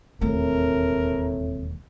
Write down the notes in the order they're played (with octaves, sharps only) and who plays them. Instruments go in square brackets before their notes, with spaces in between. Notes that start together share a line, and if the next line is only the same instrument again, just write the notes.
[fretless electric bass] E1 D#2 [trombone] A2 [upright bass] A3 C4 [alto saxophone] A#4